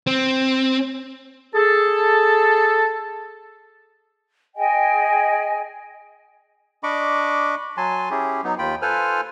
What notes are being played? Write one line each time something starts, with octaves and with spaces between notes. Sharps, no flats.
C4
G#4 A4
G#4 D#5 G5 G#5
D4 D#5 B5 C#6 D6
F#3 G#5 A5 C6
C#4 E4 G4 G#4
F#3 B3 D#4
D#2 F4 G5 B5
F4 A4 B4 C5 G#5 F6